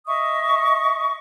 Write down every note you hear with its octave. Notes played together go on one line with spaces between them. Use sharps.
D#5 E5 C#6 D#6